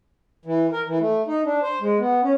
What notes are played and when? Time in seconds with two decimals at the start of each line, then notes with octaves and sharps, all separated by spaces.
0.45 E3
0.72 A#4
0.87 E3
1.01 A3
1.27 D#4
1.45 D4
1.63 C5
1.81 G#3
1.99 B3
2.23 C#4